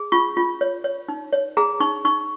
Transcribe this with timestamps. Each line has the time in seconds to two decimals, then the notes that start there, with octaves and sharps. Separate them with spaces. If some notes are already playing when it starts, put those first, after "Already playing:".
Already playing: G#4
0.12 F4 C#6
0.37 F4
0.61 C#5
0.84 C#5
1.08 D#4
1.33 C#5
1.57 G#4 A#5
1.80 D#4 C#6
2.05 D#4 C#6